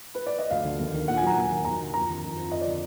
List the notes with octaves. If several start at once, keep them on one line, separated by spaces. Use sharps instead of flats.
B4
D5
D#5
D2 F5
D3
D#2
D#3
A#2 F#5
G#5
F#3 A#5
D#2 G#5
D#3
D#2 A#5
D3
F2 A#5
D#3
F2
F3
F2 D#5
D5
D3